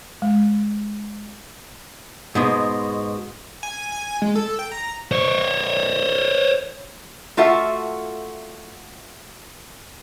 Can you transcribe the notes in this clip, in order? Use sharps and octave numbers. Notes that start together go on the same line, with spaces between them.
G#3
G#2 B2 G#3
G#5
G#5
G#3
A4
G5
A#5
C5 C#5
A3 F4 F#4 A4 E5